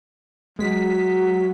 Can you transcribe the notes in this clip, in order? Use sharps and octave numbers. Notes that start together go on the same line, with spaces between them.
F#3 G#3 B6